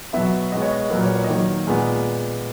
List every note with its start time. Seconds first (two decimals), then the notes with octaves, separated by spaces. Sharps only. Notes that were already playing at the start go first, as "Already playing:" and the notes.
0.13 B2 F#3 B3 E5
0.52 B2 G#3 B3 D#5
0.62 C#5
0.72 D#5
0.90 A#2 F#3 A#3 B4
1.04 C#5
1.16 C#5
1.24 D#5
1.29 D#3 F#3 A#3 C#5
1.67 A#2 G#3 B3 G#4